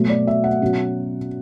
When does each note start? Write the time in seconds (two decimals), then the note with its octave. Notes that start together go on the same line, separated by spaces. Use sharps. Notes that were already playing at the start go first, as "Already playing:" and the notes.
Already playing: B2 F#3 A3
0.09 D5
0.27 E5
0.44 F#5
0.62 B2 F#3 C#4